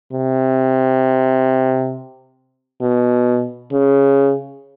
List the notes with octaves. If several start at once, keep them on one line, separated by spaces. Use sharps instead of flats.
C3
B2
C#3